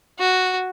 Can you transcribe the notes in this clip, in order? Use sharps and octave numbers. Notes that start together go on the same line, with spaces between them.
F#4